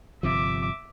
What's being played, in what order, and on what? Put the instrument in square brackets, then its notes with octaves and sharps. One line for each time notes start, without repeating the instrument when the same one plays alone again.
[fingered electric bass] G1 C3 F3 [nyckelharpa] E5 D6